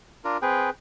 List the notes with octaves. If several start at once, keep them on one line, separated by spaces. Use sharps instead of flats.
D4 F4 A#4
C4 G#4 B4 G5